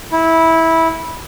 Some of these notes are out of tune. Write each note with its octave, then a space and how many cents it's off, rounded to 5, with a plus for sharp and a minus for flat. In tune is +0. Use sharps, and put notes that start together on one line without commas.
E4 -15